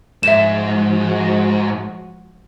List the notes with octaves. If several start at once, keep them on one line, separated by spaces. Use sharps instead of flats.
G#2 F3 G#3 F#4 E5 E7